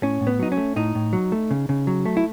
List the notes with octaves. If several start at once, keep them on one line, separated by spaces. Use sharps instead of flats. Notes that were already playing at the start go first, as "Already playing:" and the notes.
A2 C#4
A2
B3
F#3 D#4
C#4
A3
A2 D#4
A2
F#3
A3
C#3
C#3
F#3
A3
E4